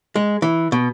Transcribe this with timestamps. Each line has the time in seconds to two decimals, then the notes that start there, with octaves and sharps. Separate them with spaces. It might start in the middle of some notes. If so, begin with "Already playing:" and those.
0.16 G#3
0.42 E3
0.72 B2